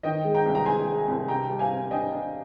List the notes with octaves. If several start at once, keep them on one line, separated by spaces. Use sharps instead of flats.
D#3 D#5 G5
G#3
G5 A#5
C2
A#5
G#3 G#5 C6
G#3
C2
C3 G5 A#5
G3
F5 G#5
C3
D4 D#5 G5
D4